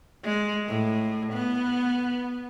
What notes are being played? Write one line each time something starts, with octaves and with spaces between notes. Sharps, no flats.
G#3
A2
B3